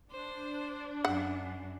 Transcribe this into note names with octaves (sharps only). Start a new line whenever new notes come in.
D4 C5
F#2 F#5